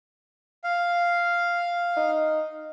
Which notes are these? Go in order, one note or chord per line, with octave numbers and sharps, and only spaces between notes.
F5
D#4